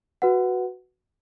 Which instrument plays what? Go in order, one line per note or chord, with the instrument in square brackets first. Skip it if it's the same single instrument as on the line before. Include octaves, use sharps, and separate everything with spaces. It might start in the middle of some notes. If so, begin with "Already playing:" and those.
[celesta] F#4 B4 F#5